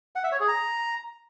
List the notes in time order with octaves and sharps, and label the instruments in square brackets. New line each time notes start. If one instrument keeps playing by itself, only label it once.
[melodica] F#5
E5
C#5
G#4
A#5